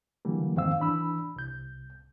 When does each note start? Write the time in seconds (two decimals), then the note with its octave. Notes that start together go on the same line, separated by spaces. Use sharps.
0.25 D3 E3 F#3 G3 A#3
0.56 F2 G#2 D#3 C4 F5 E6
0.79 E3 D4 B5 E6
1.36 C2 G6